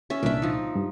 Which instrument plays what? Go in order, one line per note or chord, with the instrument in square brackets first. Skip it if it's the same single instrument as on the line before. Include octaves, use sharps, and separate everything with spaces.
[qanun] C#4 E5
[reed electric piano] C2 A#2 [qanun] D4 E5
[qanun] F3 D#4
[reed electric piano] G2